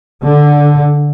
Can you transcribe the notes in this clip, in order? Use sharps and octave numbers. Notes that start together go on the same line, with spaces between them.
D3